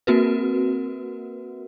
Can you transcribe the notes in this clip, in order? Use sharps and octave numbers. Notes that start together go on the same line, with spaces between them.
A#3 C4 F#4 A#4 B4